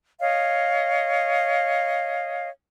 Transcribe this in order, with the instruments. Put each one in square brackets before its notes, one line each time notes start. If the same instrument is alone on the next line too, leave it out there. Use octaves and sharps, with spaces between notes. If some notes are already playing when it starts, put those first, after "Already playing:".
[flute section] C#5 D#5 F5